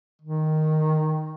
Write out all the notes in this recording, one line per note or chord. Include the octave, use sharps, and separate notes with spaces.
D#3